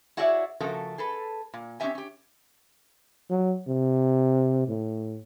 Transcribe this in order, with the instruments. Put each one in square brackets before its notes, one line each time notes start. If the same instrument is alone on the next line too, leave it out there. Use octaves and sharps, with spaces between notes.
[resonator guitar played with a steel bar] E4 F#4 G#4 C#5 D5 E5
C#3 F3 A3 F#4 A4 A#4
G#4 A4 B4
A#2
C4 C#4 D#4 G4 E5 G#5
C#4 G4
[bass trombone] F#3
C3
A2